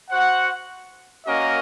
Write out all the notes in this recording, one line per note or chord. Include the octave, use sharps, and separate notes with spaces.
F#4 C5 F#5
A#3 C#4 F#4 A#4 D#5